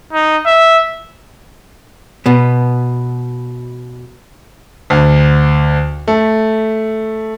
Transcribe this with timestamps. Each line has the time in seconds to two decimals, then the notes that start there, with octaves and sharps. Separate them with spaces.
0.13 D#4
0.46 E5
2.26 B2 B3
4.90 D2
6.08 A3